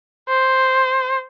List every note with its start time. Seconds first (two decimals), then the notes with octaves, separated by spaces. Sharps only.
0.29 C5